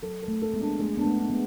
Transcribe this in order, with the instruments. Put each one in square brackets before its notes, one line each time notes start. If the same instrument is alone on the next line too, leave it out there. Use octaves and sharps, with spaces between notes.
[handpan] F#3 [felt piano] A4
[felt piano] A4
[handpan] A3
[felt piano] A4
[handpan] G#3 B3
[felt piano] D4
[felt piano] G#3 [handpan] A3
[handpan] B3 [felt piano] D4
[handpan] A3
[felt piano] D4
[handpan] G#3 B3